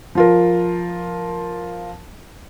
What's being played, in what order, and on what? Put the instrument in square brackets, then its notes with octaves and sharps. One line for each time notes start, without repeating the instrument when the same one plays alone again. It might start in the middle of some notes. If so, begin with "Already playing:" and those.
[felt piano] F3 F4 A#4